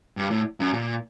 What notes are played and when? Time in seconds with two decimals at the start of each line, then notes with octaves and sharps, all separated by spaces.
0.17 G2
0.31 A2
0.60 F#2
0.74 A#2